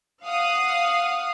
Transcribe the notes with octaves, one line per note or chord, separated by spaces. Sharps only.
F5 F#5 D#6